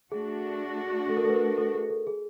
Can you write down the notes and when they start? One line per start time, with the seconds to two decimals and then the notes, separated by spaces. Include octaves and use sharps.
0.12 A3 D4 F#4 G#4
1.09 A4
1.17 A#4
1.24 A4 B4
1.34 A#4
1.58 A4
1.74 G#4
1.90 A4
2.07 G#4